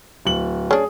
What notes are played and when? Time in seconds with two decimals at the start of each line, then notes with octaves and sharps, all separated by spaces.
0.25 D1 F#7
0.71 C#4 D4 G#4